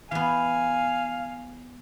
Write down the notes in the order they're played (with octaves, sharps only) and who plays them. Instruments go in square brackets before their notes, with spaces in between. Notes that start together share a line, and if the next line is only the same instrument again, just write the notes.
[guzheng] E3 B3 [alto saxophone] F5 [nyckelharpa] G#5